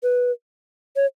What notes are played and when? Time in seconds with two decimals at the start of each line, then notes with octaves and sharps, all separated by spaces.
0.03 B4
0.96 C#5